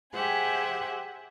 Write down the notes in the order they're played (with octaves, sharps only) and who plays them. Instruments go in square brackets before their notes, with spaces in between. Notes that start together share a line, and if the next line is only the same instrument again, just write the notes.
[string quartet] G4 G#4 C5 E5 F#5 G#5